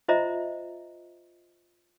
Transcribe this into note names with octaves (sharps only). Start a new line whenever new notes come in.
F4 C5 D#5 E5 A#5